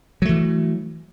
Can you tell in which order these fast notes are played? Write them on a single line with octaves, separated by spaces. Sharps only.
F#3 A3 E3